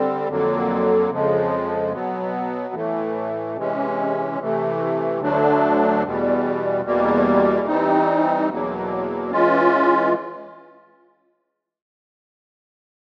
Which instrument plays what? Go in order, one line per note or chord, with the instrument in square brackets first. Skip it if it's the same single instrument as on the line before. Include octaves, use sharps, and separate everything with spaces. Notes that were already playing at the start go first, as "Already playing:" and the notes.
Already playing: [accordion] D3 G3 C4
F2 D3 F#3 A#3
F2 C#3 F3 G#3
B2 F#3 B3
A2 E3 A3
C3 E3 G#3 C#4
C3 E3 A3
D2 D3 F#3 A3 D4
E2 B2 G3
E2 B2 G3 A#3
E3 G3 C4 D#4
E2 B2 F#3 A#3
E3 G#3 C#4 F4